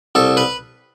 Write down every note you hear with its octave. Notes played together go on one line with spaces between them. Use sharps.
C2 A4
B4